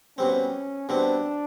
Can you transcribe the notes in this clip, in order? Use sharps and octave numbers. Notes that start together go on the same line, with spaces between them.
B2 G3 C4 C#4
B2 G3 C4 D4